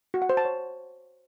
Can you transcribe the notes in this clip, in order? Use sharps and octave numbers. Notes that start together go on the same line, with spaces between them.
F#4
F#5
C5
A5
C#5